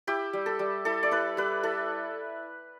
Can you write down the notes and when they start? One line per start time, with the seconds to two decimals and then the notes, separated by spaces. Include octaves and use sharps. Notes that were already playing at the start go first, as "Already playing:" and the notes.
0.07 E4 G4
0.33 G3
0.46 A4
0.59 G3
0.85 E4 A4
1.03 D5
1.11 E4 B4
1.37 G3 B4
1.63 E4 A4